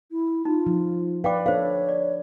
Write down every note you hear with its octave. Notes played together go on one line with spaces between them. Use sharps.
E4
D#4 F4
F3
B4 D5 F5 G5 D6
D4 A4 C5 C#5 F5
D5